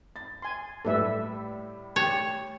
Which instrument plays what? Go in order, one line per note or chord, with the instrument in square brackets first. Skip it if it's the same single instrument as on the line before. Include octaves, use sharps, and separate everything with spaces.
[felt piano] A6
[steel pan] G#5 C6
[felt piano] A2 G3 [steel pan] A4 B4 E5
[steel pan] G4 A5 [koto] C#5